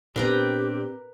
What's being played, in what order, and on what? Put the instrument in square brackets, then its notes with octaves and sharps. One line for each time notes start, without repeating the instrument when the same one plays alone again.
[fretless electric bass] A#2 B3 [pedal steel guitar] C4 D4 [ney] G4 [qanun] A#4 B4 A#5